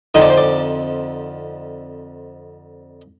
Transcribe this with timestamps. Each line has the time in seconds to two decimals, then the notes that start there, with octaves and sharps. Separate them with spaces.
0.15 F2 D3 F3 C4 D#4 D#5
0.22 D5
0.30 C5
0.38 D5